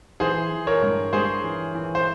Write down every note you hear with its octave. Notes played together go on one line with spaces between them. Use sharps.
E3 G#4 C5
E3
A#4 C#5
G2
G2 G#4 C5
E3
E3
C5